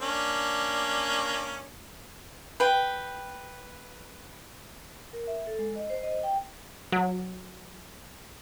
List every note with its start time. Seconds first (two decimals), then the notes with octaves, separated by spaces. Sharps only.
0.01 A#3 C#4 D4
2.60 B4 G5
5.13 A#4
5.27 E5
5.47 A4
5.59 G#3
5.76 D#5
5.90 C5
6.03 D#5
6.23 G5
6.92 F#3